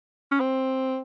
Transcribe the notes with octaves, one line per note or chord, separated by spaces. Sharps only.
C#4
C4